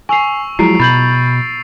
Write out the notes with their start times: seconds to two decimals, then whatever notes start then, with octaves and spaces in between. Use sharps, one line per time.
0.09 G#5 C#6 E6 C7 F7
0.59 F3 F#3 G#3 E4 A#5 C7 D7
0.80 B2 B5 G6 A6 F#7